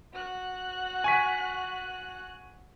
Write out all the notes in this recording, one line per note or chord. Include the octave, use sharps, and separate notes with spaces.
F#4 F#6
G#5 C#6 B6